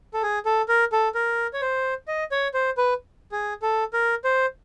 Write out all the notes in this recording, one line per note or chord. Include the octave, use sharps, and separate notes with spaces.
A4
G#4
A4
A#4
A4
A#4
C#5
C5
D#5
C#5
C5
B4
G#4
A4
A#4
C5